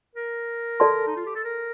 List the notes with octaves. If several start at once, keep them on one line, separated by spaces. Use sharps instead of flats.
A#4
A4 D5 A5 C6
D#4
F4
G4
A4
A#4